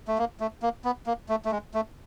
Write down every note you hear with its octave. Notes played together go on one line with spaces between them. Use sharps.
A3
A#3
A3
A#3
B3
A#3
A3
A3
G#3
A3